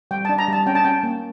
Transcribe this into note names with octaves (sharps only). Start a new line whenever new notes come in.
G3 G5
D4 A5
A#5
G3 A5
C#4 G5
A5
C#4 G5
A#3